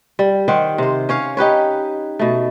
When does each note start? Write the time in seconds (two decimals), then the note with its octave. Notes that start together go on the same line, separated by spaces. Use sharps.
0.19 G3
0.48 D#3 G4 C5 F#5
0.78 C3 C5
1.09 C#4 C#5 F5
1.37 D#4 G4 B4 C#5
2.19 B2 A3